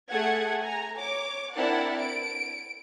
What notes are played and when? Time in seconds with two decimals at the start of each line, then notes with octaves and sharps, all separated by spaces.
0.11 A3 G#4 F#5 G#6
0.63 G#5 A#5
0.98 C#5 D6
1.55 C4 D4 E4 A#4 D5 F#5
2.00 D7